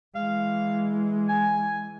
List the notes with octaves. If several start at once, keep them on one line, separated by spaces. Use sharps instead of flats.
E3 G#3 F5
G#5